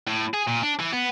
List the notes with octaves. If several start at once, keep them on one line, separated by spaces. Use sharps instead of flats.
A2
G#4
A#2
D4
E3
B3